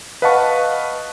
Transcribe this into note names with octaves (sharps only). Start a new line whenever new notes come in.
B4 D#5 F5 F#5 A5 C#6